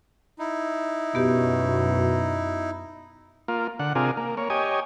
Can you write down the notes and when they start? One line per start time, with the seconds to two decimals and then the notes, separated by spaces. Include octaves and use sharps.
0.39 D#4 E4
1.15 F#2 B2 B3 G4
3.48 A#3 F4
3.79 D3 F#5
3.95 C3 D4 F4 G#4 A#4
4.17 A#3
4.37 A#3 C#5
4.50 G4 C#5 D#5 G#5